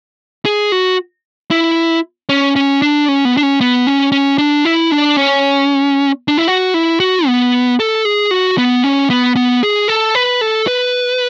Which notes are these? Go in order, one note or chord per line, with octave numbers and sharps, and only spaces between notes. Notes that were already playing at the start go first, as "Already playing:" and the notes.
G#4
F#4
E4
C#4
C#4
D4
C#4
B3
D4
C#4
B3
C#4
C#4
D4
E4
D4
C#4
D4
E4
F#4
E4
F#4
B3
A4
G#4
F#4
B3
C#4
B3
B3
G#4
A4
B4
A4
B4